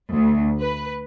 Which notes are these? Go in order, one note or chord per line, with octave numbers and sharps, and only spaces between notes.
D2
B4